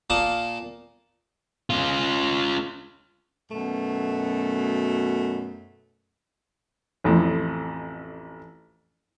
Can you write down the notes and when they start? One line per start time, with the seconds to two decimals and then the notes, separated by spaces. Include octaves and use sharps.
0.10 A#2 A#3 A5 D#6
1.70 C#4 F4
3.51 F#2 B2 A3
7.04 A1 F2 A2